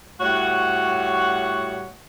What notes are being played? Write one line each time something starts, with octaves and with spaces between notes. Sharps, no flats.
A2 G3 F#4 C#5 F#5